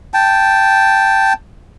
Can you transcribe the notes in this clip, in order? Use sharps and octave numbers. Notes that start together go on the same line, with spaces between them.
G5 A5